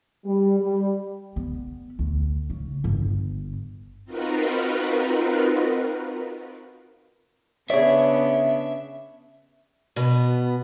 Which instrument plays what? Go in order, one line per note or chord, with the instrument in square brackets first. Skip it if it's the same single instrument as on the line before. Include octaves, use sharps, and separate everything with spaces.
[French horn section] G3
G3
[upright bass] B3
D2
C#3
G1
[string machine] C4 D#4 F4 F#4 A#4 B4
[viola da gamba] C#3 B3 D4 [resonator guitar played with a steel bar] G#4 D5 [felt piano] C#5 [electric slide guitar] E5
[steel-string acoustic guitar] B2 B3